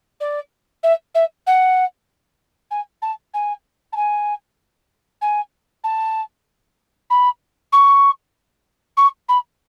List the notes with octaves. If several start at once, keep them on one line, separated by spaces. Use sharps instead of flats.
D5
E5
E5
F#5
G#5
A5
G#5
A5
G#5
G#5
A5
B5
C#6
C#6
B5